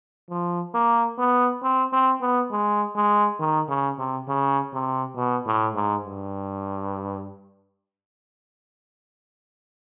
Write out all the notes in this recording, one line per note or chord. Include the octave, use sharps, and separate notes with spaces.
F3
A#3
B3
C4
C4
B3
G#3
G#3
D#3
C#3
C3
C#3
C3
B2
A2
G#2
G2